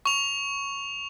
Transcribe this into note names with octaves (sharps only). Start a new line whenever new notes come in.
C#6 F7